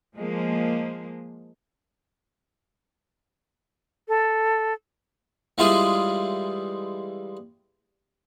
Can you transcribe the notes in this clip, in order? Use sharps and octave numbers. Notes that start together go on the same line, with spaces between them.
F3 G#3 A#3
A4
E3 G3 G#3 E4 F4 G#4